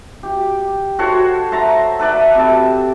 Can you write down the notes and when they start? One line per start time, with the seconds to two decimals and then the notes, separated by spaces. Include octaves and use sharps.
0.23 G4
0.99 F#4 A4 C5 C#5
1.52 C5 E5 A5 A#5
1.99 A4 B4 D5 E5
2.35 C3 A5